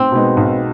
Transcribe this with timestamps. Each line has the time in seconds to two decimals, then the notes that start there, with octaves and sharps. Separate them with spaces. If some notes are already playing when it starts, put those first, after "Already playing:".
Already playing: B1 C4
0.12 B2 G#3 B3 D#4
0.37 B1